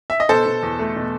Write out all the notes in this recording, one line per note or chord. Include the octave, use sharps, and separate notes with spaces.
E5
D#5
B2 A4 C5
B2
E2
A3
B2